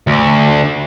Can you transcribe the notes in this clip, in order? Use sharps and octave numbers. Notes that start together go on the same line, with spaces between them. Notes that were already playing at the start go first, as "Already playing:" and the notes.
D2